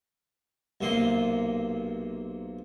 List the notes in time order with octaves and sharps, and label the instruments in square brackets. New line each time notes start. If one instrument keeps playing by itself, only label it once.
[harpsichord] B1 C3 A#3 C6